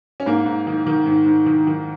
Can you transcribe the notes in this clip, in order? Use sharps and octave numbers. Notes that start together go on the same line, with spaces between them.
C#4
G#2 A#3
G#2
D#3
D#3
G#2
G#2
D#3
D#3